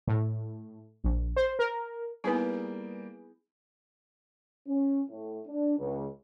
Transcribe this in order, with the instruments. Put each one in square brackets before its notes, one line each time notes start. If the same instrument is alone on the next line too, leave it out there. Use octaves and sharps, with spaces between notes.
[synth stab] A2
A#1
C5
A#4
[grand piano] G3 A#3 [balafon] B3 D#4 E4 [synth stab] G#4 B4
[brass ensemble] C#4
A2
D4
C#2